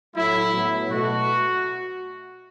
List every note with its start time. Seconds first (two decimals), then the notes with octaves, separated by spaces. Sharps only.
0.15 A2 F#3 A3 E4
0.52 A2 F#3 B3
0.89 B2 A3 F#4